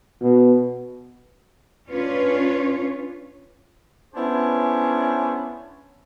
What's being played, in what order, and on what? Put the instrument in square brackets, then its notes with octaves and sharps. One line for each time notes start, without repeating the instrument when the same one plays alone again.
[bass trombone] B2
[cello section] C#4 D4 F4 B4 C#5
[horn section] B3 C#4 D4 E4 G#4 C5